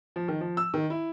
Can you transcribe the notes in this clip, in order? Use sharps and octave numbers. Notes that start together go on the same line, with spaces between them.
F3
D#3
F3
E6
D#3
E4